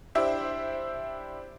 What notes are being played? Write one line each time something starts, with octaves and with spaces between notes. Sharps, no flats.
D4 E4 G4 C5 E5